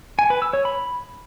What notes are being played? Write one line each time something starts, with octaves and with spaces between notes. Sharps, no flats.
G#5
B4
E6
C#5
B5